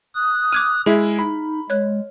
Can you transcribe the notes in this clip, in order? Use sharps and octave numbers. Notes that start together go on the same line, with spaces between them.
D#6 F#6
D6 F6 G#6 D#7
G#3 E4 G#4 E5
D#4 B5
G#3 C#5 F#6